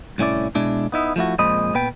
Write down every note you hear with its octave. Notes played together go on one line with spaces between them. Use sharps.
C2 A2 C#4 E4 D5
B2 G#3 D4 E4
B3 D#4 E4
F3 A3 E4 F#4
F2 A#2 G#3 C5 D#5 B5
A#2 B3 B4 G5